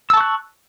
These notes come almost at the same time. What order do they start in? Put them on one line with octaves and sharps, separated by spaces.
E6 A5 C#6 F#6